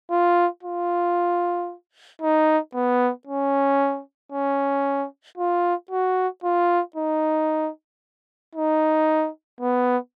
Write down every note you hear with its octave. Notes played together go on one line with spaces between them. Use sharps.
F4
F4
D#4
B3
C#4
C#4
F4
F#4
F4
D#4
D#4
B3